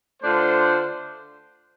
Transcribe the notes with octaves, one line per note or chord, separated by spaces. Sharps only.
D3 A3 D4 F4 C5